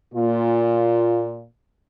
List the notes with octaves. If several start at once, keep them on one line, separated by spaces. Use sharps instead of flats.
A#2 F4